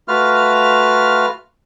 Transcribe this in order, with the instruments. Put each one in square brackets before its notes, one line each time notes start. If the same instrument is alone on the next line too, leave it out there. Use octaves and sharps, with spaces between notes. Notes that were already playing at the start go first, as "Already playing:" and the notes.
[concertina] A3 F4 F#4 B4 F5 F6